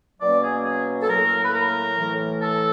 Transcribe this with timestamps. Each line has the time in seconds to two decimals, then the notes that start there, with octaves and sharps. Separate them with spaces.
0.20 B2 F#3 A#3 C#4 D5
0.42 G#4
0.65 G#4
1.01 A4
1.09 A2 F#3 A#3 A#4
1.43 B4
1.53 A#4
1.97 A2 E3 A3
2.42 A4